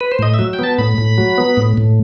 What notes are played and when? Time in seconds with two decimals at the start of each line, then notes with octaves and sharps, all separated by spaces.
0.01 B4
0.12 C5
0.19 A2 D#5
0.34 E5
0.39 F#3
0.53 G5
0.59 B3 A5
0.78 A2 B5
0.98 A2
1.18 F#3
1.38 B3
1.57 A2
1.77 A2